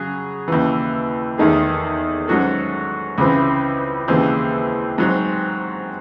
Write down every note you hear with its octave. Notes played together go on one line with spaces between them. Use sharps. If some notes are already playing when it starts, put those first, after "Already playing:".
Already playing: C#3 F#3 G#4
D#2 C#3 E3
E2 D#3 A3 D#4 G#4
G#2 F#3 C#4 F#4 A4
C#2 C#3 E3 C4 E4
D#2 C#3 E3 G#3 C4
G#2 F#3 C4